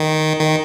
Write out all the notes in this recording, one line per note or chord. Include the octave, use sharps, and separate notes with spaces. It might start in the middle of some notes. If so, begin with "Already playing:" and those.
Already playing: D#3
D#3